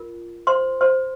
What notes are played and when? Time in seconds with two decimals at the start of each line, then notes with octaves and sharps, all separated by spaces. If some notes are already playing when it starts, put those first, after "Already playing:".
Already playing: F4 A#4
0.47 C5 C6
0.81 C5 C6